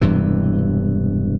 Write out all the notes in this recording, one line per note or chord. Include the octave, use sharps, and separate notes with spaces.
E1 G2 C3 E3